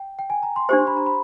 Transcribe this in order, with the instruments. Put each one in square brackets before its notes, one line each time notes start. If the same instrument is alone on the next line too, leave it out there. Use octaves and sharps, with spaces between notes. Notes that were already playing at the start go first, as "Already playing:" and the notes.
Already playing: [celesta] G5
G5
G#5
A#5
C6
[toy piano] D4 G4 C5
[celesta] C6
B5
A#5
B5